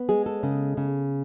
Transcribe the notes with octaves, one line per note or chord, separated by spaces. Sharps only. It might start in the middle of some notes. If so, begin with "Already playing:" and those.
Already playing: B3
G#3 G#4
A4
C#3
C#3